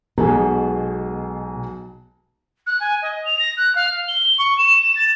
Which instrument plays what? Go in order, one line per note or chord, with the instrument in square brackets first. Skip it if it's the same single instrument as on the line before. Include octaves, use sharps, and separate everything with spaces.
[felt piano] B1 G#3 G#5 [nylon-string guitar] B2
[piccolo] F#6
G#5
D#5
F7
A#6
F#6
F5
G7
C#6
E7
A6